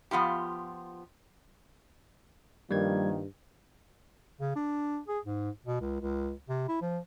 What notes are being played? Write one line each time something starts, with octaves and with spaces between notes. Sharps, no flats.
F3 B3 F4 G4
G2 D#3 F3 G3 A#3 G#6
C#3
D4
G#4
G#2
B2
C#2
C#2
C3
E4
F3